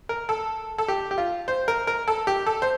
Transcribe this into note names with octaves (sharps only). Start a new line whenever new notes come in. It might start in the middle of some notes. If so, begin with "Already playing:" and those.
A#4
A4
A4
G4
G4
F4
C5
A#4
A#4
A4
G4
A4
C5